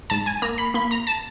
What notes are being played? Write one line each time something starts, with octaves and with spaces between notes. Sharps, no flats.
G#2 A5
G#5
A#3 A#5
B5
A#3 B5
A#5
A5